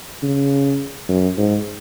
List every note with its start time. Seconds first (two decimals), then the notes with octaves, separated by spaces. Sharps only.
0.23 C#3
1.09 F#2
1.37 G#2